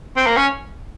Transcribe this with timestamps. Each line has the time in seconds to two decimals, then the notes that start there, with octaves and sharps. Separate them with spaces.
0.16 C4
0.27 A#3
0.37 C#4